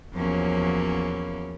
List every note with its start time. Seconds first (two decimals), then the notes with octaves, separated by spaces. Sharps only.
0.14 E2 F3 F#3 A#3 C#4